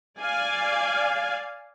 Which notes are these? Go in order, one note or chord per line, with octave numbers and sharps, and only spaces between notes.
D5 F5 G#5